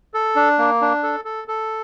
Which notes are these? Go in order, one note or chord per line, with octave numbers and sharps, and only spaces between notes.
A4
D4
A#3
D4
A4
A4
A4